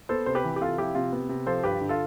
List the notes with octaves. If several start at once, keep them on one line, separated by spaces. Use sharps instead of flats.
B3 A4 C5
C3 C5
G4 B4
E3
G4
C3 F4 A4
F3 E4 G4
C3 F4
B3
C3
F3 A4 C5
G2 G4 B4
D3
F4 A4